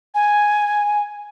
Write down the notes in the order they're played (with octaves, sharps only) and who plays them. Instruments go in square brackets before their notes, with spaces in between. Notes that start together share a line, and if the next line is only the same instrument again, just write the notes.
[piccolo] G#5